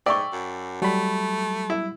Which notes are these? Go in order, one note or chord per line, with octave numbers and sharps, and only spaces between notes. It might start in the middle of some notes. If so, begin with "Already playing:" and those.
G#2 D5 E5 G5 C#6
F#2
F#3 G3 A3 B5
E4